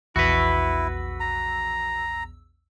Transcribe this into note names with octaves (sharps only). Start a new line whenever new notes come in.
A#1 E2 E4 F#4 B4 E6
A#5